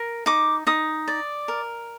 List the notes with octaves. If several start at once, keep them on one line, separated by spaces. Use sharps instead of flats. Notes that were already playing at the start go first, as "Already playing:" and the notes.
Already playing: A#4
D#4 D6
D#4 D#6
D5
A#4